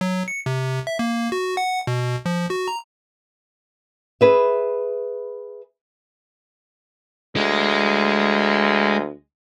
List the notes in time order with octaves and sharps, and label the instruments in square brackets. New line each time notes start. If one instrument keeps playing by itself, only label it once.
[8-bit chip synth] F#3
C#7
C3
E5
A#3
F#4
F#5
B2
F3
F#4
A#5
[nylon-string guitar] G#4 B4 E5
[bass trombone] D2 [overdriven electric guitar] G#3